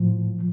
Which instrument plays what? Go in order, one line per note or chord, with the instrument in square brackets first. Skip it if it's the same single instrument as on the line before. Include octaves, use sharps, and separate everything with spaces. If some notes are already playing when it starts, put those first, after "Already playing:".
Already playing: [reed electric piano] A2 F3